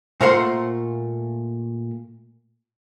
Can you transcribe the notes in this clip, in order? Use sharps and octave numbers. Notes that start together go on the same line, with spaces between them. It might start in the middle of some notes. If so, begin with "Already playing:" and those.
A#2 A3 A#4 C5 F#5 C6